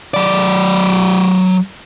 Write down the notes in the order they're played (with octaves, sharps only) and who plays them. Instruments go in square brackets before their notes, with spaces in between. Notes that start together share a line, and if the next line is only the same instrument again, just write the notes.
[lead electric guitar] F#3 D5